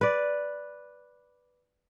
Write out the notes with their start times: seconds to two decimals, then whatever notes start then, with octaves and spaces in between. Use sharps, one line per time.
0.01 B4 D5